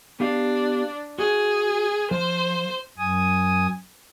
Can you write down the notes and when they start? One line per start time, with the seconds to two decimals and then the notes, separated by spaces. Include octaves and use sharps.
0.20 B3 D4 G4 F5
1.19 F#4 G#4
2.11 F3 C5
2.98 F#2 G#5 D#6